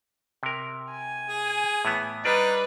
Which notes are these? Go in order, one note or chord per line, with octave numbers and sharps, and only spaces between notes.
C3 A#4
G#5
G#4
A2 E3 B3
G3 D4 D#4 B4 D5